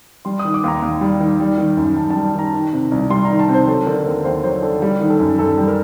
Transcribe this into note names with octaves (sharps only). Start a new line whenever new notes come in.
G3 C6
D#6
D#3
D6
D#2 A#5
D#2
G3
D#3
G3
D#3
F#2
F#2 A5
A5
G3
D#3 A#5
D#3
C3
C2
G3 C6
A#5
D#3
A5
C3
C5
F#3 A4
D3 A#4
D#2 A#4
D#2 C5
F#3 C5
D3 A4
G3 G4
D#3
A4
F#2
F#2 A4
G3
A#4